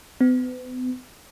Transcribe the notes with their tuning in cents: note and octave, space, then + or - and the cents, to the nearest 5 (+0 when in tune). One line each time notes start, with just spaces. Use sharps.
B3 +40